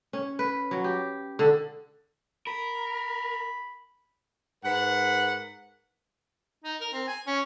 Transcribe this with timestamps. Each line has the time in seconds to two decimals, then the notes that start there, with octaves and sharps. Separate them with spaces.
0.13 C#4
0.39 B4
0.71 F#3
0.84 G4
1.39 D3
2.47 A#4 B5
4.64 G#2 A#4 B4 F#5
6.64 D#4
6.81 A#4
6.93 C4
7.08 G#5
7.27 C#4